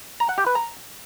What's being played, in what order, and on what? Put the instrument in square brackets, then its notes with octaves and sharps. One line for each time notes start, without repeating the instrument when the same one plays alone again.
[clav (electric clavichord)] A#5
F#5
G4
B4
A#5